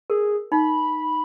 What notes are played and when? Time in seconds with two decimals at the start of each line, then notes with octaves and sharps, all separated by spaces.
0.10 G#4 A#4
0.52 D#4 B5